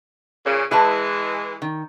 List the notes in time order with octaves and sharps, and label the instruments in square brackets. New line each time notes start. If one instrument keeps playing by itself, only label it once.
[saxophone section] A#2 C#3
[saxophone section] E3 G#3 [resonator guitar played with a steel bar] E4 B4 A5
[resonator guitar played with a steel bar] D#3